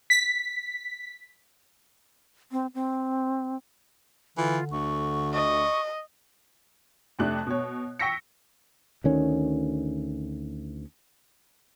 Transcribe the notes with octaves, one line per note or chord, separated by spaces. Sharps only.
B6
C4
C4
D3 E3 F4
D2 C#6
D#5 C#6
F2 C3 A3 D4 F#6
B2 C#5
G5 C#6 E6 A#6 B6 C#7
D2 D#3 C#4